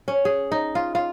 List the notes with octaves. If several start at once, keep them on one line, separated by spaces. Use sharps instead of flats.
C#4
G#4
D#4
F4
F4